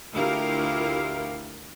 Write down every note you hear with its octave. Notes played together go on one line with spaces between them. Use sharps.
D2 E4 F4 G4 A#4 F5